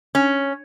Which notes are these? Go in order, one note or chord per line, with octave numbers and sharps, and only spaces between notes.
C#4